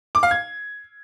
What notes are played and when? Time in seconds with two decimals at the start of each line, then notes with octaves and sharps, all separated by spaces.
0.15 D6
0.23 F5
0.31 G#6